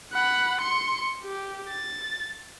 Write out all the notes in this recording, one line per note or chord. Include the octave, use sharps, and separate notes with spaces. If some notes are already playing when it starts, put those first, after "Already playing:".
F#5 B5
C6 C#7
G4
A6